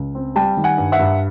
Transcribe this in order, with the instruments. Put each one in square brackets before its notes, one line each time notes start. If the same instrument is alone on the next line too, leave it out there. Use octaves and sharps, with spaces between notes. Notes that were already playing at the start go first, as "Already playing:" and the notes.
Already playing: [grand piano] C#2
C4
G3 G5 A5
D#3
F#5 G#5
G2
E5 F#5
G2